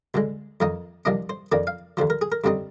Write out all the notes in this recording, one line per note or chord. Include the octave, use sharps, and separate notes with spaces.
D2 D3 G#3
F2 D#3 A#3 D#4
C2 C3 F3 A#3 D4 D#5
C5
F2 D#3 A#3 D4 D5
F5
D#2 D3 F3 C5
A#4
G#4
A#4
G2 D3 G3 C4 D#4